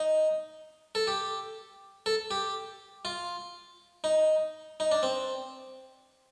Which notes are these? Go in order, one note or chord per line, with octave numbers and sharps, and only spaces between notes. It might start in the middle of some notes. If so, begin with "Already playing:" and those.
Already playing: D#4
A4
G4
A4
G4
F4
D#4
D#4
D4
C4